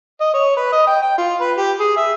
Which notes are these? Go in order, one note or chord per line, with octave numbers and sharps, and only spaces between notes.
D#5
C#5
B4
D#5
G5
G5
F4
B4
G4
G#4
E5